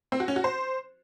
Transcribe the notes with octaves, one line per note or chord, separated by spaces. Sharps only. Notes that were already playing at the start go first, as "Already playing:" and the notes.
C4
F#4
C#4
F#4
C5